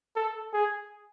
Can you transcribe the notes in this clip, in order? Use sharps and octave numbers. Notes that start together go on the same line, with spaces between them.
A4
G#4